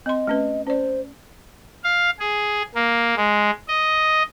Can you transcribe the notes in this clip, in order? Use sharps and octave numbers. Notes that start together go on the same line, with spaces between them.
C4 D#5 C6
A3 C#4 B4
C#4 C5 D5
F5
G#4
A#3
G#3
D#5